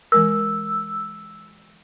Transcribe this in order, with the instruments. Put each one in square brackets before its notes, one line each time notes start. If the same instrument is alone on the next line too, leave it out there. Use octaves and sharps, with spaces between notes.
[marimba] E3 G#3 A#4 [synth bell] E6